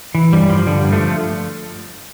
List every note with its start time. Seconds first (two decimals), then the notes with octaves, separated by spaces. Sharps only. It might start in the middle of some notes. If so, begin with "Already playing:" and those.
0.15 E3
0.33 G2 G3
0.49 G2 F3
0.67 D3 G3
0.84 G2
0.93 F3 A3